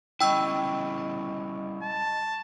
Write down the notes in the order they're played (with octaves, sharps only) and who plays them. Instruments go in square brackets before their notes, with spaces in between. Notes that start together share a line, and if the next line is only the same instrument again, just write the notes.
[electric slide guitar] G3 C#4 E4 [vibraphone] D#5 B5 C#6 [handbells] G5 E6
[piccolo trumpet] A5